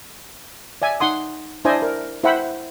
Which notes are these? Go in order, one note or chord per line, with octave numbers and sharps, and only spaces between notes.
D5 E5 G#5
D#4 F#5 C6 D#6
D4 E4 C5 D5 D#5 G#5
A#4
E4 C5 E5 F#5 G5 B5